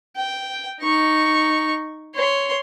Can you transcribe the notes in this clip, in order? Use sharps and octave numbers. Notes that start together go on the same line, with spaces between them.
G5
D#4 C#6
C#5 C6